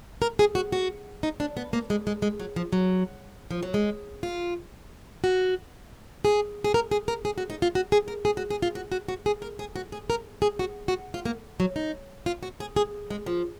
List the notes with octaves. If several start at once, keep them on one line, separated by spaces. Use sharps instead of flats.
A#4
G#4
F#4
F#4
D#4
D4
B3
A#3
G#3
G#3
G#3
F#3
F3
F#3
F3
F#3
G#3
F4
F#4
G#4
G#4
A#4
G#4
A#4
G#4
F#4
D#4
F4
F#4
G#4
A#4
G#4
F#4
G#4
F4
F#4
F#4
F#4
G#4
A#4
G#4
F#4
G#4
A#4
G#4
F#4
F#4
F4
A#3
F#3
D#4
F4
F#4
G#4
G#4
G#3
F3